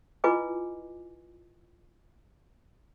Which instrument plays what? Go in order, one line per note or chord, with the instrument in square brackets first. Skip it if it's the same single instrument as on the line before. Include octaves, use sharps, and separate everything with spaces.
[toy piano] E4 F4 B4 D#5 G#5 D6